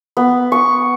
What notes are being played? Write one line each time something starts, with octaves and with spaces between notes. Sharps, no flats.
B3
C#6